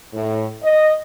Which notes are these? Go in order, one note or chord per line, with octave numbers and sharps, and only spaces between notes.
A2
D#5